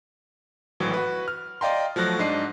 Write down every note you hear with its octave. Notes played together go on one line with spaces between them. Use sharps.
G#1 A2 E3 F#3
F#4 B4
F6
D5 D#5 F5 G5 A#5 C6
F3 F#3 A3 F#6 A#6
G#2 D4 D#5 C7